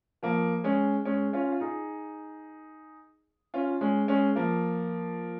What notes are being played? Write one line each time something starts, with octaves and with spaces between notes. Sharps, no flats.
F3 A#3
G#3 C#4
G#3 C#4
C#4 F4
F4
D#4 G#4
C#4 F4
G#3 C#4
G#3 C#4
F3 A#3